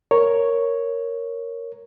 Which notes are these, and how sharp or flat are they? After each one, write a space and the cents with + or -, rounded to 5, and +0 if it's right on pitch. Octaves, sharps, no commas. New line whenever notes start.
A#4 +0 C#5 +0